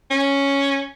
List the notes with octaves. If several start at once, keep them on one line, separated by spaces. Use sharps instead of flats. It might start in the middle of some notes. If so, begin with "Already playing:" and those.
C#4